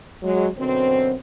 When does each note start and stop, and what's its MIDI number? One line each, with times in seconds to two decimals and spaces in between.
0.22 0.47 54
0.22 0.47 56
0.57 1.14 42
0.57 1.14 47
0.57 1.14 50
0.57 1.14 60